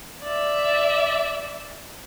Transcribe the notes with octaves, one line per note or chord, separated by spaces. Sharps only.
D5 E5